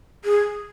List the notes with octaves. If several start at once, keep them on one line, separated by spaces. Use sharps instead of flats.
G#4